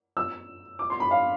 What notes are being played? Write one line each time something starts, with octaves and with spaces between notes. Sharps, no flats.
E6
D6
C6
B5
F5